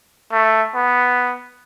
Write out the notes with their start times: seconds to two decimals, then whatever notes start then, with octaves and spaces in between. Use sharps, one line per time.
0.32 A3
0.75 B3